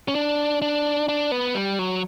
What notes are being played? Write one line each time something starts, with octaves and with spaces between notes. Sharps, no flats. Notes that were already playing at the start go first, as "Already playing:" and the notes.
C#4
D4
D4
D4
B3
G3
F#3